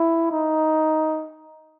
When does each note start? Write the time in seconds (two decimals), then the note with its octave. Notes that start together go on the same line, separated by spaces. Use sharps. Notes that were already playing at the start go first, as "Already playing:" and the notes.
Already playing: E4
0.31 D#4